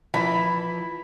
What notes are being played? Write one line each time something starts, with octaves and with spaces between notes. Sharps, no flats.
E3 F3 E4 B5